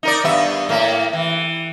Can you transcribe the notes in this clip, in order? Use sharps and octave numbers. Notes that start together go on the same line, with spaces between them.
D#4 A#4 D5
G2 B3 E5
A2 A#3
E3